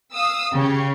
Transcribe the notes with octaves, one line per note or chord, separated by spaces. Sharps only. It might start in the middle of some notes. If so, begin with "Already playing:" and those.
F5 D#6 E6
C#3 G4 C#5